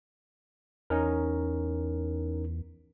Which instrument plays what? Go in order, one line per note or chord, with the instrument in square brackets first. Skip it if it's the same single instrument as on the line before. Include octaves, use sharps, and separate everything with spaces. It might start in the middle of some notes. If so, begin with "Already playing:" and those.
[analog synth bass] E2 [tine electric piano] C#4 D#4 A#4